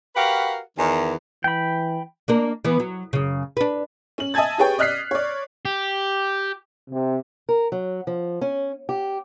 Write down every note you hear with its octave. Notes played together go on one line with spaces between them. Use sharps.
F#4 G4 A#4 B4 F5 F#5
E2 D#3
E3 G5 B5
A#3 D4 A#4
E3 B3
F#3
F#2 C#3
D4 B4
C#4 F#7
D#5 E5 G#5 A5 G#6 A6
G4 G#4 B4 C#5 G5
D5 D#5 F6 F#6 B6 C7
C#5 D5
G4
C3
A#4
F#3
F3
C#4
G4